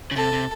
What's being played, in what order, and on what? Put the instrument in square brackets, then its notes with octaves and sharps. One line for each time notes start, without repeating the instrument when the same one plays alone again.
[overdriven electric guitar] C#3
[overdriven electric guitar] C3 [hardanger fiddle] A4
[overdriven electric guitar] C3